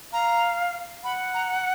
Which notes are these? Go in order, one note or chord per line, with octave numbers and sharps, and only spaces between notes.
F5 A#5
F#5 B5
A#5